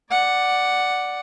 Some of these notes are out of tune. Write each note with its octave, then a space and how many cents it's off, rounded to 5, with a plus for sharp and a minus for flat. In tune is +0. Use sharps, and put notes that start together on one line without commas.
D5 +0 F#5 +0